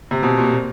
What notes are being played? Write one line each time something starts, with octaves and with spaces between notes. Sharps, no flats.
C3
B2
A#2
A#2